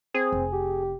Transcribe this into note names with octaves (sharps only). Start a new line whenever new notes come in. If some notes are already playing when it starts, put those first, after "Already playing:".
C4 G#4
F1
G4